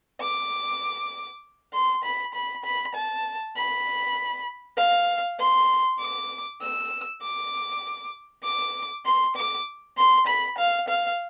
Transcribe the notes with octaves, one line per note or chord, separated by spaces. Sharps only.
D6
C6
B5
B5
B5
A5
B5
F5
C6
D6
E6
D6
D6
C6
D6
C6
B5
F5
F5